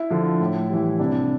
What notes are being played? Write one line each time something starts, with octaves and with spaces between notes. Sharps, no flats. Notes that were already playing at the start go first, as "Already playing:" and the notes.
Already playing: E4
D3 F3
A2
E3 G3
C2 D4